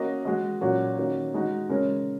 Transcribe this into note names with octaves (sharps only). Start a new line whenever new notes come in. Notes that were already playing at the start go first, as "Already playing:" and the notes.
Already playing: A#3 C#4 F#4 D#5
G#3 F#4 D#5
A#2 F#3 C#4 F#4
D#3 A#3 C#4 F#4
G#3 D#4 F#4
C#3 G#3 C#4 A#4 C#5